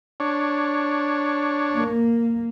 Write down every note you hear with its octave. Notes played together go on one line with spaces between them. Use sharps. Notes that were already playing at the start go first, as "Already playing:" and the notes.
D4 C#5
A#3